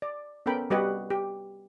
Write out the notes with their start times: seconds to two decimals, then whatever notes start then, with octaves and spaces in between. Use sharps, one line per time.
0.02 D5
0.46 B3 C#4 A4 A#4 G5 B5
0.70 G3 F#4 G4 B4 D#5 F#5
1.10 G4